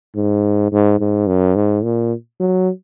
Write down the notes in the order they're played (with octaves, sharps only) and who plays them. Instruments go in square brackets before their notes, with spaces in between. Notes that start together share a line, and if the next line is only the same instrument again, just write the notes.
[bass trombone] G#2
G#2
G#2
F#2
G#2
A#2
F#3